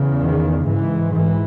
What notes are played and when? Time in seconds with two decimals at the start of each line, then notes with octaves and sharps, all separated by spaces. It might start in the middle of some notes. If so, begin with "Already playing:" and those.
Already playing: E2 C#3
0.20 D#3
0.66 G#2 E3
1.12 E3